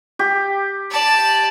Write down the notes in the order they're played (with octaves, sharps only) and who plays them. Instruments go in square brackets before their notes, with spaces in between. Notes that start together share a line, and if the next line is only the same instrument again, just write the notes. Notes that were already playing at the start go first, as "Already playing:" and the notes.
[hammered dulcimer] G4
[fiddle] D5 A5